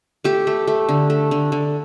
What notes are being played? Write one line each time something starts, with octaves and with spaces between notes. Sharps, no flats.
A3 G4
A3
A3
D3
A3
D3
D3